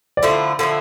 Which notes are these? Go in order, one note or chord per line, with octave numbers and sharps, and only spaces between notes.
D5
D3 F3 A3 E4 C5
D3 F3 A3 E4